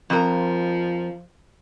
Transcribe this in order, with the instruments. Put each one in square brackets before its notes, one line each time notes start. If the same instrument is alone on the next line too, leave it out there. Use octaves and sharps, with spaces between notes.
[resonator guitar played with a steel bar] F2 A#4 [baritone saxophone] F3